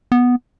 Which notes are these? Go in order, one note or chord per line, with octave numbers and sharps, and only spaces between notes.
B3